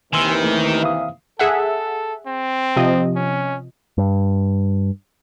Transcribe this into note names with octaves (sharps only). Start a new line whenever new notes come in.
D#2 C3 D#3 E3 G#5 C6 E6
A3
E5 F5 D#6
G#4 A4 E5 F#5
C4
C3 F3 D#5
C#4
G2